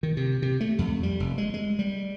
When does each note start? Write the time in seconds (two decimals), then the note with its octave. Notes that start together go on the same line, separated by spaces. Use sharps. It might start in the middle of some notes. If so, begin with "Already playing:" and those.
0.03 D#3
0.17 C3
0.42 C3
0.60 A3
0.79 F2
1.03 G3
1.20 F1
1.38 G#3
1.54 G#3
1.79 G3